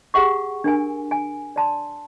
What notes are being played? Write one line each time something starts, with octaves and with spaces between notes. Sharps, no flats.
G4 G#4 F5 F#5 C#6
D4 A#4 G#5
G#5
D5 A5 C6